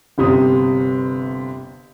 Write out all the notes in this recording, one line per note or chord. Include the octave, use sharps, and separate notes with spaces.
G1 C3 D#6